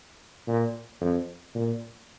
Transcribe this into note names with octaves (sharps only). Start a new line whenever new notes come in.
A#2
F2
A#2